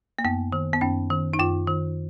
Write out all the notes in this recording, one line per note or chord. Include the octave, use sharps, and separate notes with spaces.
A#3
F#2 B3
D#3
B3
F#2 C#4
D#3
D#4
F#2 F4
D#3